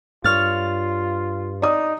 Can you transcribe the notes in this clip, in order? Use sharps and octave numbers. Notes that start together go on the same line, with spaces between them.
G2 F4 C#5 F6 A6
D#4 D5 D#6